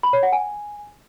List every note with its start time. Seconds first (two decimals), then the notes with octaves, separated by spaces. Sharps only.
0.03 B5
0.13 C#5
0.23 F#5
0.33 G#5